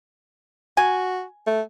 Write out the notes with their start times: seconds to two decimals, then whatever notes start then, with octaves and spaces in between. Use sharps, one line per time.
0.77 F#4 G#5
1.47 A3